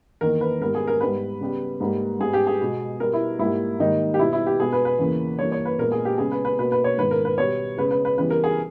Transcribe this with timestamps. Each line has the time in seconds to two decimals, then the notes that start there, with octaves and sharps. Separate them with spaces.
0.21 E2 D#3 A#3 A#4
0.41 B4
0.60 G#2 G3 B3 A#4
0.75 G#4
0.87 A#4
1.00 G#2 G3 B3 B4
1.41 C#3 G3 B3
1.81 G#2 G3 A#3
2.20 G#2 G3 B3 G#4
2.33 G4
2.47 G#4
2.61 B2 G#3 B3
3.00 B2 G3 B3 A#4
3.13 E4
3.39 G#2 G3 A#3 E4
3.79 G#2 D#3 G3 A#3 D#4
4.14 G4
4.19 B2 G3 B3 E4
4.33 E4
4.46 G4
4.60 B2 G#3 B3 G#4
4.73 B4
4.85 B4
4.99 E2 C#3 E3 A#3
5.39 G2 E3 A#3 C#5
5.52 C#5
5.65 B4
5.79 A#2 G#3 B3 A#4
5.92 G#4
6.05 G4
6.18 C#3 G#3 B3 G#4
6.31 B4
6.45 B4
6.58 B2 A#3 B4
6.72 B4
6.84 C#5
6.98 G#2 D#3 G#3 B3 B4
7.11 A#4
7.25 B4
7.38 B2 G3 B3 C#5
7.77 C#3 G#3 B3 B4
7.91 B4
8.05 B4
8.17 C#3 E3 G3 B3 B4
8.30 A#4
8.44 G#4